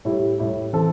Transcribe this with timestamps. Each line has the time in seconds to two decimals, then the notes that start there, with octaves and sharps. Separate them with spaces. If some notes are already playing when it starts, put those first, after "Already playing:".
0.05 A2 G3 E4 G4
0.39 A2 G3 E4 G4
0.73 E3 C4 A4 C5